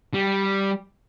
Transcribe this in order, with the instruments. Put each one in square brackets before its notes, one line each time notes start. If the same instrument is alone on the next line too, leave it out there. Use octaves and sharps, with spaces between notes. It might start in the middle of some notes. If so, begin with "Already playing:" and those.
[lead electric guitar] G3